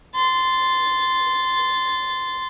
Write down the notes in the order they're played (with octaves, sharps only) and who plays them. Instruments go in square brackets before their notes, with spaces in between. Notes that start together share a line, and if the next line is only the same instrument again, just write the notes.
[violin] C6 A6